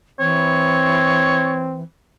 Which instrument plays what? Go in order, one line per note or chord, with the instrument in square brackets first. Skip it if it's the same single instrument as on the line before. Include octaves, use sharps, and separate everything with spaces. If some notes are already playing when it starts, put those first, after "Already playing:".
[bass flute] E3 [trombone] C4 [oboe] C#5